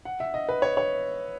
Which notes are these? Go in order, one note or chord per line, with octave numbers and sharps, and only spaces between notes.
F#5
E5
D#5
B4
C#5
C#5